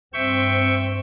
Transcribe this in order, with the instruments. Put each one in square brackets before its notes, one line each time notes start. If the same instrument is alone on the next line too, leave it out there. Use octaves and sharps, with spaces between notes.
[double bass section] G2 C4 [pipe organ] E5 G5 C#6